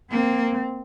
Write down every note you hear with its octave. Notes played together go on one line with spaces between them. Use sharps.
A#3 C4